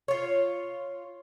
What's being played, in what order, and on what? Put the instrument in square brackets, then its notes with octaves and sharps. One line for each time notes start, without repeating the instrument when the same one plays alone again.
[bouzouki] F4 C#5